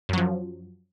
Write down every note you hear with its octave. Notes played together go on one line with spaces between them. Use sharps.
F#2 F3 F#3